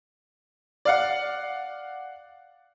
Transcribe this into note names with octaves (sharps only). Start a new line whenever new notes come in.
D5 F5 F#5